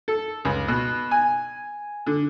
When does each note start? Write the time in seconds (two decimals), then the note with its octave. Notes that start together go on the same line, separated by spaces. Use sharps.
0.08 A4
0.45 C#2
0.68 B2
1.11 G#5
2.07 D3